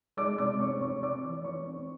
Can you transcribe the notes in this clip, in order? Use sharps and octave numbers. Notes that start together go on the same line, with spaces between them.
G#3 D5 D6
C3 D5 D6
C4 C#5 C#6
C3 C#5 C#6
C4 D5 D6
E3
E3 C#5 C#6
C4